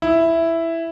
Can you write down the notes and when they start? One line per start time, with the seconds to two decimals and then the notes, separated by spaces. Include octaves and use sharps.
0.02 E4